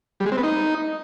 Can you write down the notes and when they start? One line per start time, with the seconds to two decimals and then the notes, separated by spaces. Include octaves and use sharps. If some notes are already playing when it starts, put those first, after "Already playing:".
0.20 G3
0.26 G#3
0.32 C4
0.38 B3
0.43 D#4